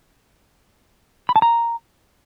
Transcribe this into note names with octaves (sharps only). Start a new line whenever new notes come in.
B5
A5
A#5